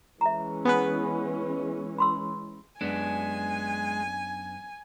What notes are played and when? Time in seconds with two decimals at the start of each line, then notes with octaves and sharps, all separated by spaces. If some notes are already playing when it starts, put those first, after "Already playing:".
0.21 E3 G#3 C#4 E5 A#5
0.65 B3 G#4 B4
1.98 B5 C6 E6
2.81 F#2 G#3 B3 D4 G#5